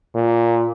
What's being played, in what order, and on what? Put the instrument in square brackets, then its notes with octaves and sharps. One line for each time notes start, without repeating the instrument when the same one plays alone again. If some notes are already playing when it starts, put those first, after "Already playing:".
[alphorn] A#2